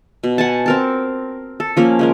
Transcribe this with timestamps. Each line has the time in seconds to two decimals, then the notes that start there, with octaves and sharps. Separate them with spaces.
0.23 B2
0.38 F#5 G#5 A5
0.66 C4 A#4 A5
1.60 A4
1.77 F3 A#3 C#4 A#4
1.99 C#3 G#3 A#4